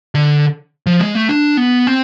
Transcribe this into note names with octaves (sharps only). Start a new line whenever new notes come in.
D3
F3
G#3
A3
D4
B3
C4